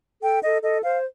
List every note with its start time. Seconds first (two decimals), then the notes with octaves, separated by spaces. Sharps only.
0.22 A4 G5
0.43 A4 D#5
0.62 A4 D#5
0.84 C5 F5